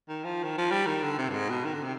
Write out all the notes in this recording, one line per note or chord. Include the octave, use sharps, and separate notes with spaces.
D#3
F3
D#3
F3
G3
D#3
D3
C3
G2
G#2
B2
D#3
D3
C3